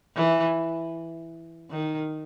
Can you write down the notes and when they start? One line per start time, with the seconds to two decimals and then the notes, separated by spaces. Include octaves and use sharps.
0.16 E3
1.70 D#3